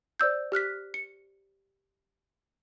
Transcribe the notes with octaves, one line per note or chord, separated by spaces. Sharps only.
C5 D5 E6 G6
G4 F6 F#6 B6
C#7